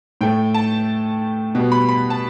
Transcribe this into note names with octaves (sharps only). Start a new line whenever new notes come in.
A2 A3 G5
A5
B2 G3 B3
B5
B5
A5